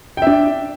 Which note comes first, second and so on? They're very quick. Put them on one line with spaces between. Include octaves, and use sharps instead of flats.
G5 E5 D4